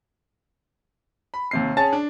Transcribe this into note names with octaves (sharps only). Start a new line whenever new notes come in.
B5
D#2 C3 C7
C#4 G#4 C#5 A5 A6
D4